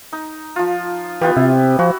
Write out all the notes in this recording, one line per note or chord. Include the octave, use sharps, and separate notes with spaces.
D#4
F3 F4
E3 B3 F4 G4
C3 E4
F3 F#4